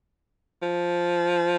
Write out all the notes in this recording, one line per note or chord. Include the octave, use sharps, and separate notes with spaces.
F3